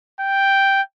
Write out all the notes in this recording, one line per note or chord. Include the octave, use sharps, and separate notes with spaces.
G5